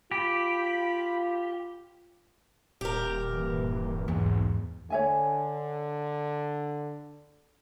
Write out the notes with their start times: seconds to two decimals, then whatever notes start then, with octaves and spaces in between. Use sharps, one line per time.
0.11 F4 G4 B5
2.81 D#1 G4 A#4
3.27 G2 E3 A#3
4.08 B1 E2 G#2
4.90 D3 C#5 E5 G#5